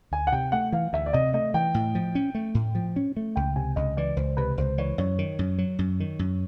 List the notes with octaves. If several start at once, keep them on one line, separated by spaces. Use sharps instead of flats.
D2 G#5
F#5
C3 G5
A3 F#5
E3 F5
D2 E5
D5
C3 D#5
A3 D#5
E3 G5
A2
F3
C#4
A3
A2
F3
C#4
A3
C#2 G5
C3 G#5
C#2 D#5
E3 D5
C#2 C5
C3 B4
C#2 C5
E3 C#5
F#2 C#5
D#3
F#2
F#3
F#2
D#3
F#2